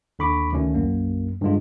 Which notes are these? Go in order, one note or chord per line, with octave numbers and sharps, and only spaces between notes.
D#2 D3 B5 C#6 D6
D2 D#3 A3 C#4
B1 F#2 A#3
G2 D3 G#3 F4